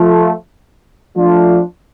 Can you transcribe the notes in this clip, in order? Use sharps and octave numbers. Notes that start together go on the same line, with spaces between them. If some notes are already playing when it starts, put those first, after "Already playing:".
Already playing: F3 A3 F4
F3 A3 D4 F4